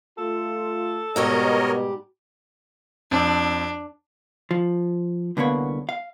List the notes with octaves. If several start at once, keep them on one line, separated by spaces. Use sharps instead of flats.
A3 F4 A4
G#2 B2 G3 G4 A#4 C#5 D#5
F2 C4 D4
F3
C2 D3 A#3 B3 C#5
F5